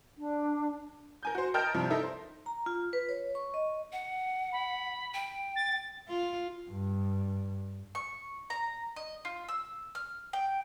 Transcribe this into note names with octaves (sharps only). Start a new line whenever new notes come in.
D4
A#4 G#5 G6
F#4 C5
A#4 D#5 G5 A5 F6 G6
G2 C3 F3
D#4 A4 A#4 E5
C5
A#5
F4
B4
C#5
C#6
D#5
F#5
B5
G5
A6
F4
G2
C#6
A#5
D#5
F4
E6
F6
G5